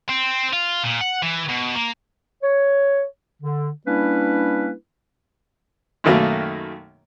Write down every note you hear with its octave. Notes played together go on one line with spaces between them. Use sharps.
C4
F4
A#2
F#5
E3
B2
A#3
C#5
D3
G3 A#3 C#4 D4 E4 B4
F#2 B2 D#3 A3 A#3